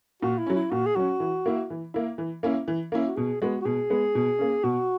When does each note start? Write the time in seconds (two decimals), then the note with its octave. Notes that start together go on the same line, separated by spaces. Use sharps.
0.23 A#2 F#4
0.39 E4
0.47 F#3 C#4
0.55 E4
0.71 A#2 F#4
0.86 G#4
0.96 F#3 C#4 F#4
1.20 E3
1.46 A#3 E4
1.70 E3
1.94 A#3 E4
2.18 E3
2.43 A#3 C#4 E4
2.68 E3
2.92 A#3 C#4 E4
3.07 F#4
3.16 B2 G#4
3.42 G#3 B3 F#4
3.61 F#4
3.65 B2 G#4
3.90 G#3 B3
4.15 B2
4.39 A#3 C#4
4.64 B2 F#4